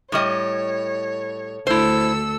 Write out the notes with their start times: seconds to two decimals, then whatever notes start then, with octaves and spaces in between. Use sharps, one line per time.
0.12 A2 G3 C#5 D#5
1.67 D2 E4 A4 C5 E6